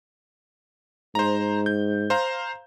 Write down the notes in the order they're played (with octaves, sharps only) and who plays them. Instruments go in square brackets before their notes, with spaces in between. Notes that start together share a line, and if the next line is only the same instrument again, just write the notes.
[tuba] G#2 [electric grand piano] C5 A#5
[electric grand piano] G6
C5 F5 A#5